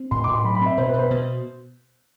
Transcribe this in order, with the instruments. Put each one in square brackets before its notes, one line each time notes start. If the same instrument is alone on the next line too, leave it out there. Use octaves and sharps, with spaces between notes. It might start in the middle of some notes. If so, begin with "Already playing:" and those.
Already playing: [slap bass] C4
[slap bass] A2 [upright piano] C6
[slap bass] A2 [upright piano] D6
[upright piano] C6
[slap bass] F#3 [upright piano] B5
[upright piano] B5
[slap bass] C4 [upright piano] E5
[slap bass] B2 [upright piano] C5
[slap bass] B2 [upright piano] B4
[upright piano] C5
[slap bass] B2